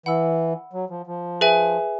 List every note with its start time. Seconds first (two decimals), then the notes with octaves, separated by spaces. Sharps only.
0.06 E3 F#5 B5 E6
0.73 F#3
0.90 F3
1.07 F3
1.41 G#4 B4 E5 G#5